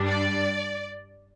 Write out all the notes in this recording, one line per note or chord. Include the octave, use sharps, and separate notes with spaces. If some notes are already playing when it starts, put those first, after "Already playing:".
Already playing: G2 G3 D4
D5